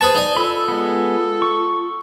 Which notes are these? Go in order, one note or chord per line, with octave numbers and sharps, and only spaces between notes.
G#4 B4 C5 A5 C#6
D#4 D5 G#5
F4 A4 B5 E6
G#3 B3
C#6